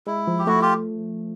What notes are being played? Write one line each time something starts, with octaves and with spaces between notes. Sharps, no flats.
G#3 E4
F3
G4
A3 E4 F#4
F4 G4